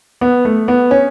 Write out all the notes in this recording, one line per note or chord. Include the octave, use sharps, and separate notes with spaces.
B3
A3
B3
C#4